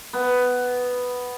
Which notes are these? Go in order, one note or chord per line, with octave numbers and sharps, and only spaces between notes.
B3